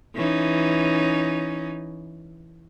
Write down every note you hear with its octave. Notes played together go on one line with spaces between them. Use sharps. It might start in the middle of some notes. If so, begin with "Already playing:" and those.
E3 C#4 D#4